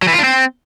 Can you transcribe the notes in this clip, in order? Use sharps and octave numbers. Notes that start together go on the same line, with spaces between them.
F#3
E3
F4
D4
C4